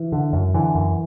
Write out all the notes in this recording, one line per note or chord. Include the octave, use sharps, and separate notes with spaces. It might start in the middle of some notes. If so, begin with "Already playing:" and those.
Already playing: E3
D3
F#2
D3 E3
F#2